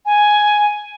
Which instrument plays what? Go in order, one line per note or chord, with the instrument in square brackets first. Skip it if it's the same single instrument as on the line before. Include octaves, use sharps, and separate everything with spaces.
[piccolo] G#5